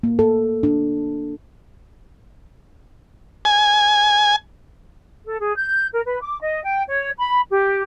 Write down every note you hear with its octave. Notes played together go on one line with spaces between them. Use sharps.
A#3
A4
D4
G#5
A4
G#4
G6
A#4
B4
D6
D#5
G5
C#5
B5
G4